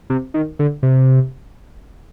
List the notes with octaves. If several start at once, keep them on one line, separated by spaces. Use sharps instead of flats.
C3
D#3
D3
C3